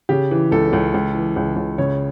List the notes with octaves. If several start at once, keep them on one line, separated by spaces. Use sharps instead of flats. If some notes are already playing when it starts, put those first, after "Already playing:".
C#3 G4
E3
C#2 A4
C#2
C#2
E3
C#2
C#2
C#3 C#5